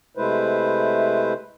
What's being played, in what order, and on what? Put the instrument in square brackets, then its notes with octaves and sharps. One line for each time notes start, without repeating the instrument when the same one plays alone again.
[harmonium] C3 G#3 A3 E4 B4 C5